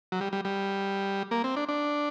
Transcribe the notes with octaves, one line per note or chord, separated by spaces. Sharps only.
F#3
G3
G3
G3
A#3
C4
D4
D4